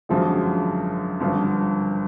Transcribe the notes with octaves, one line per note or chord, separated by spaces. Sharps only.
G#1 F#2 D3 F3 G#3
G#1 G2 D3 F3